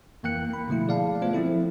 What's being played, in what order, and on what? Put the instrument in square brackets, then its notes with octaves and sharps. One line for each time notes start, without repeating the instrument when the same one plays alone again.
[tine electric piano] F2 E3 A#3 G5 F#6 C#7
A#3 B5
B2 D3 F3 A3 E4
G#4 D5 F5 A5
A3 B3 F4 C5
F3 C4 E4 A4